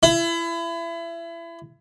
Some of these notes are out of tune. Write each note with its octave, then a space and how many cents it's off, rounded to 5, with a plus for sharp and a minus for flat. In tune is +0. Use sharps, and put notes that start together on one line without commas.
E4 +30